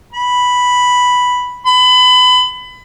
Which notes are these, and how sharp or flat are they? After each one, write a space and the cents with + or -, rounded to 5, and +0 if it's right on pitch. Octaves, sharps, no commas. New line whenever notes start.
B5 +0
B5 +30